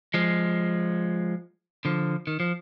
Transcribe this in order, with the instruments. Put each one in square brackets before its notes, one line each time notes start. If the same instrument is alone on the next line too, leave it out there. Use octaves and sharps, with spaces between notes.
[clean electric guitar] F3 G#3
D3 F3
D#3
F3